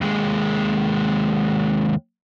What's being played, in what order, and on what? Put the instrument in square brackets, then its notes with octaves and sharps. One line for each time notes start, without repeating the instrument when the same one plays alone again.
[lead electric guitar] D#2 G#3